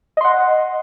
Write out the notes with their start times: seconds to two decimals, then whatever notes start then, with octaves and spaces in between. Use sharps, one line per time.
0.17 D#5
0.21 C6
0.24 F#5